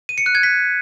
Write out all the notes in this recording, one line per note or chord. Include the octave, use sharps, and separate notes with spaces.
D#7
C#7
F#6
G#6
B6